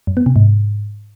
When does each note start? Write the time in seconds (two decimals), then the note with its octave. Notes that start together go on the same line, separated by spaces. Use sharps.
0.07 F#2
0.17 B3
0.26 C3
0.36 G#2